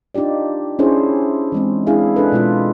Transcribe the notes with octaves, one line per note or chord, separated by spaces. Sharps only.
D4 D#4 F4 G4 D5
C#4 D4 E4 G#4 C5 C#5
E3 G#3 C4
G#3 D4 E4 G#4 F5
D4 A4 B4
B2 G#3 F4